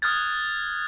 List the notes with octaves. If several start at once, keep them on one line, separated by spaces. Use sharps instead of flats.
D#6 F6 F#6 G#6 A6